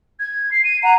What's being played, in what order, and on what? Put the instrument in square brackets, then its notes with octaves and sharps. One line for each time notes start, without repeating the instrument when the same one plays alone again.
[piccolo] G#6
C7
D#7
[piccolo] F#5 [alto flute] A#5